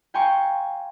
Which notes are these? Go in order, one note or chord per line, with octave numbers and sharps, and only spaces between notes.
F5 G5 G#5 A#5 C6 C#6